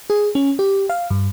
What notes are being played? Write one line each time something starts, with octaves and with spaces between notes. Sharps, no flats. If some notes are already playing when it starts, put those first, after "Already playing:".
G#4
C#4
G4
F5
G2